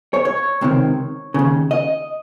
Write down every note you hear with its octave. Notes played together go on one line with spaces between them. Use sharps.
C#5
C#5
C#2 C3 D#3
D#2 C#3
D#5